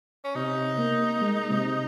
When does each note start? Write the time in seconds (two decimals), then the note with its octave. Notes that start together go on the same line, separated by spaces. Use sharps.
0.24 C#4
0.35 C3 D#4
0.78 A#3
1.21 G#3
1.50 C3